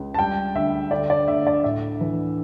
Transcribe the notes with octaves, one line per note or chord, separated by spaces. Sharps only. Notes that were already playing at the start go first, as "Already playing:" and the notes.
Already playing: C#2
A5
G3 G5
D2 E5
D3 D5
D5
D2 E5
D5
A2 E5
E3